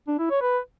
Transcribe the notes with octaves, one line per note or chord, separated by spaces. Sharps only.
D4
E4
C#5
B4